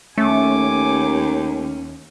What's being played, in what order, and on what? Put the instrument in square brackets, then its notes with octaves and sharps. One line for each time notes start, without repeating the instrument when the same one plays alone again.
[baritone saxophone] D#2 [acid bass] A3 [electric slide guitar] C#4 [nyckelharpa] G#5 D6